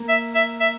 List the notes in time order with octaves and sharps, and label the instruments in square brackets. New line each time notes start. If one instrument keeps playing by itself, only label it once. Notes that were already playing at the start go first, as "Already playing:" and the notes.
Already playing: [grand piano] A#3
[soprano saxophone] E5
E5
E5